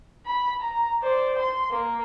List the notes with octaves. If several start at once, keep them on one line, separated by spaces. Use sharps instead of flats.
B5
A#5
C5 D5
C6
A#3